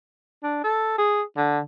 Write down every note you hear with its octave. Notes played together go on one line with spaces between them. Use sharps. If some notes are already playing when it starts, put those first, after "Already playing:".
D4
A4
G#4
D3